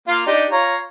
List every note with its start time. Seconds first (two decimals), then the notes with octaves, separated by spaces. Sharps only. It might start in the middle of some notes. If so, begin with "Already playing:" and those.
0.08 A#3 F4 F5
0.27 D4 D#4 G4
0.52 F4 C#5 A#5